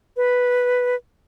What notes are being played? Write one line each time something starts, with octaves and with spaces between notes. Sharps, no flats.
B4